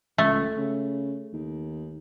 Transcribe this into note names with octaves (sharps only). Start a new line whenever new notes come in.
C#2 A3
C#3
D#2